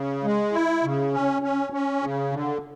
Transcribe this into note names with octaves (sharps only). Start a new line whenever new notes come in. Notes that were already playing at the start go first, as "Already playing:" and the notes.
Already playing: C#3
G#3
E4
C#3
C#4
C#4
C#4
C#3
D3